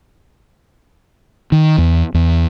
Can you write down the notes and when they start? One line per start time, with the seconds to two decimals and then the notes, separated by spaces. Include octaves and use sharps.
1.52 D#3
1.78 E2
2.14 E2